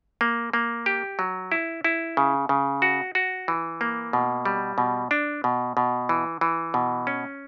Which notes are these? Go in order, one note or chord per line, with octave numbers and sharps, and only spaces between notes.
A#3
A#3
G4
F#3
E4
E4
C#3
C#3
F#4
F#4
E3
A#3
B2
G3
B2
D4
B2
B2
E3
E3
B2
C#4